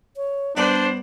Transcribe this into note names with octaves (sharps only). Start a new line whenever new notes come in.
C#5
G2 B3 D4 C5 D5 F#5